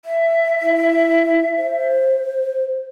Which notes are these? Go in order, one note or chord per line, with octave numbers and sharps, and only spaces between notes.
E5
E4
C5